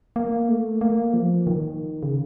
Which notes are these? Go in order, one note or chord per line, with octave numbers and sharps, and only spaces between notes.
A#3
A3
A#3
F3
D#3
C#3